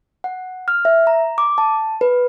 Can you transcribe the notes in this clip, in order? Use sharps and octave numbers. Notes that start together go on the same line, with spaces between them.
F#5
F6
E5
A#5
D6
A5
B4